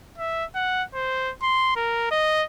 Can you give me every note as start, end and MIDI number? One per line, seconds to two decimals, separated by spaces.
0.18 0.45 76
0.55 0.83 78
0.94 1.32 72
1.42 1.75 84
1.76 2.08 70
2.11 2.43 75